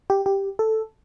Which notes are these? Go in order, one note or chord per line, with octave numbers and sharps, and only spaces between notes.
G4
G4
A4